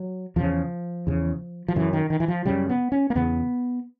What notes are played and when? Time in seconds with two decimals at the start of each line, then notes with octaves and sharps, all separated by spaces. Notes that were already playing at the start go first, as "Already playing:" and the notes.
Already playing: F#3
0.36 E2 C#3 F3
1.07 E2 C#3
1.68 F3
1.76 F#2 C#3 E3
1.93 D#3
2.10 D#3
2.20 E3
2.28 F3
2.45 F#2 C#3 G3
2.69 B3
2.92 C#4
3.10 A#3
3.15 E2 C#3 B3